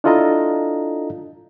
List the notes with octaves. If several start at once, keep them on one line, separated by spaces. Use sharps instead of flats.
D4 E4 F4 A4 D#5 A#5